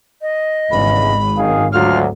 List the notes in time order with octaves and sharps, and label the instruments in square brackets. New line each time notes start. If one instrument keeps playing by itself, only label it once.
[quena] D#5
[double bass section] G#1 [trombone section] E2 G2 C#3 [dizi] B5
[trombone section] F#2 D#3 G#4 [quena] F5
[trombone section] D2 F#3 [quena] F4 [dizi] F6